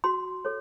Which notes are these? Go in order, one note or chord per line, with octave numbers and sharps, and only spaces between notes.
F#4 C6
A4 C#5